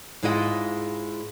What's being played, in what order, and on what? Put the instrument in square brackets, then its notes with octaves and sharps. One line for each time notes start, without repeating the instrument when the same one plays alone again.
[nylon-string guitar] G#2 G#3 E4 F4 D#5 F#5